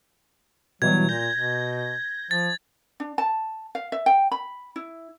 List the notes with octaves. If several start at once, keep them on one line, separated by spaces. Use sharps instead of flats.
B2 E3 F#3 G3 G#6
A#2 G6 A#6
B2
F3 A6
D4
A5
F5
E5
G5
B5
E4